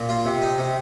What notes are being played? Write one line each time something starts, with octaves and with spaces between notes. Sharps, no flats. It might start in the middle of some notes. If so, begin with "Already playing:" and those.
Already playing: A#2
F4
C3
D#4
C3